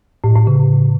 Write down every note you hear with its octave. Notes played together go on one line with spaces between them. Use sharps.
A2
A2
C#3